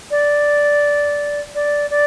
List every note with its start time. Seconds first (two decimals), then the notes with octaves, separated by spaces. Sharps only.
0.11 D5
1.55 D5
1.90 D5